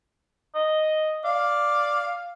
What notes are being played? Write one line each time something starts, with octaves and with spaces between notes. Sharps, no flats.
D#5
D5 F5